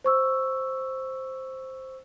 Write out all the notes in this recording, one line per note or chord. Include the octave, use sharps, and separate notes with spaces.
C5 C#6 E6